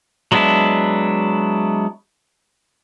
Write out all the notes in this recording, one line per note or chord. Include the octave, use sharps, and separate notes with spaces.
F#3 G#3 B3 D4 E4